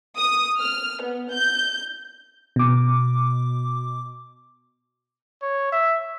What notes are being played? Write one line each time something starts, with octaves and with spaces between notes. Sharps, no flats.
D#6
F6
B3
G6
B2 D6
C#5
E5